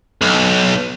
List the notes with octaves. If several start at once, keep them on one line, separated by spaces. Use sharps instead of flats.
B1